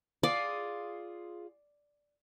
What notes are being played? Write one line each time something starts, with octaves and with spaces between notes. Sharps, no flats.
F4 G#4 D5